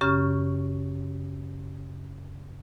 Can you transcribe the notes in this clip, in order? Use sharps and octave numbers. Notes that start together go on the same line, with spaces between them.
F#2 C#3 C#4 G4 C#6 F6